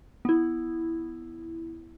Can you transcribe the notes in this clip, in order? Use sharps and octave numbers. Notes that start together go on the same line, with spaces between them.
B3 E4